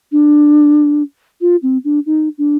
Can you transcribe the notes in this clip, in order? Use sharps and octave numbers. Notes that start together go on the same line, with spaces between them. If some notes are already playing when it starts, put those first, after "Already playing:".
D4
F4
C4
D4
D#4
D4